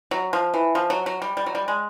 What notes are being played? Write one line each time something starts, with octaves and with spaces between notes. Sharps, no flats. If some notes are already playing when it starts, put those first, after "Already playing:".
F#3
F3
E3
F3
F#3
F#3
G3
G3
F#3
G3
G#3